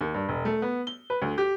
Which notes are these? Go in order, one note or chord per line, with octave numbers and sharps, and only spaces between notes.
D#2
G2
E1
A3
B3
G7
B4
D2
G4